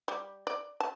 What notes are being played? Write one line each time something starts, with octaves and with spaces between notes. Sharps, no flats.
G3
D5
A5